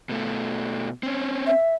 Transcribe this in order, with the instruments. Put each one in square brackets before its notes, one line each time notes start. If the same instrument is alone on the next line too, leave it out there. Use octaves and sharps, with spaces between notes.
[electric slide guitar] B2 A3
C4 C#4
[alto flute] E5